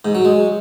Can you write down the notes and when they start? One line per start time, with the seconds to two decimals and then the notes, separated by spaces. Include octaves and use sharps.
0.05 G#2
0.15 F#3
0.25 G#3